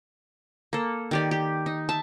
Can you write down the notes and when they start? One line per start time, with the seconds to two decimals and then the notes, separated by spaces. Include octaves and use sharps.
0.73 A#3 A4
1.11 D#3 G4 D5
1.31 G4
1.66 D#4
1.89 E5 A5